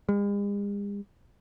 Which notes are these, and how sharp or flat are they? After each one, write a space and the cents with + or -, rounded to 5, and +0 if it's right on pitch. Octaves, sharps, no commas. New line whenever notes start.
G#3 -45